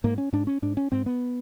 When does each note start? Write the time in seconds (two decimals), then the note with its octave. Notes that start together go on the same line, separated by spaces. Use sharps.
0.04 G#2 A#3
0.18 C#4
0.33 G#2 D4
0.47 C#4
0.62 G#2 D4
0.77 C#4
0.92 G#2 C4
1.06 B3